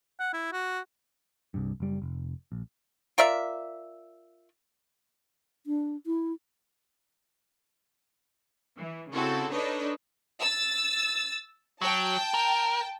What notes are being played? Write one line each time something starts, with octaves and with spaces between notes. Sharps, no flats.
F#5
E4
F#4
C2 G2
F#1 G3
F1
A#1
F4 A#4 D5 E5
D4
E4
E3
C#3 C4 E4 F#4 A4
D4 D#4 A4 B4 C#5 D#5
E6 A6
F#3 G5 A5
A#4